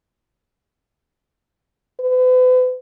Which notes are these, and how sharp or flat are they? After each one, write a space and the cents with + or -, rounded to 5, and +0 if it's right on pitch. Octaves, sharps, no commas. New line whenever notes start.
B4 +40